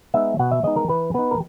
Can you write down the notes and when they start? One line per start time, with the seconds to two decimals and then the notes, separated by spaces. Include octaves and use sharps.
0.14 G#3 B3 D#4 E5
0.39 B2 F#5
0.51 E5
0.64 G#3 B3 D#4 D#5
0.76 A#4
0.89 E3 B4
1.14 B3 D#4 B4
1.31 A#4